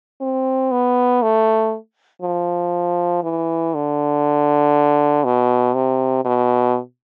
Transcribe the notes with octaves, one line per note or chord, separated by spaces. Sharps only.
C4
B3
A3
F3
E3
D3
B2
C3
B2